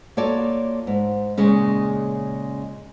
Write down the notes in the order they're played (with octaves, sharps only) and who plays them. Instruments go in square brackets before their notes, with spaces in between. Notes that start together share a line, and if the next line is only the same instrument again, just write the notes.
[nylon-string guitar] A#3 F4 F#4 A4 C#5 D5
G#2
A#2 C#3 G#3 C#4